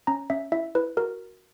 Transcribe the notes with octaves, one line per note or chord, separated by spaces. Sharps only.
C#4 A#5
C#4 E5
E4 E5
E4 B4
F#4 A#4